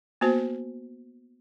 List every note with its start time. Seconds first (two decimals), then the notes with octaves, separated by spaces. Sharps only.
0.21 A#3 B3 F#4 C5